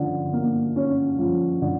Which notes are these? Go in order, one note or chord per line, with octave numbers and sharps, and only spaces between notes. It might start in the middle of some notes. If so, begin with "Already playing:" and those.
Already playing: D3 F3 C#4
A#3
C#4
F3
D3